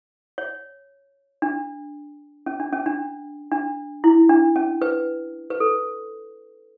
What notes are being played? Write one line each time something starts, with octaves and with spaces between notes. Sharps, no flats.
C#5
D4
C#4
D4
C#4
D4
D4
E4
D4
C#4
B4
B4
A4